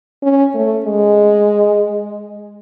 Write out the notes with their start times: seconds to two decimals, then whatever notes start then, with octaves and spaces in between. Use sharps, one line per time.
0.23 C#4
0.55 A3
0.86 G#3